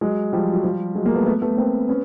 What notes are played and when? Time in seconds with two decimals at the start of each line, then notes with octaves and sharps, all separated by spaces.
0.01 F#3 G#3
0.33 F3 G3
0.53 F#3
0.64 F3 G3
0.95 F#3 G#3
1.05 G#3 A#3
1.15 A3 B3
1.26 A3 B3
1.42 A3 B3
1.57 A#3 C4
1.89 B3 C#4